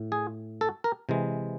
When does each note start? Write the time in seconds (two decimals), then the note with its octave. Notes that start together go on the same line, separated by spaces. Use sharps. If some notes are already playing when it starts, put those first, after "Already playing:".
Already playing: A2
0.12 G#4
0.61 A4
0.84 A#4
1.09 C3 E3 G#3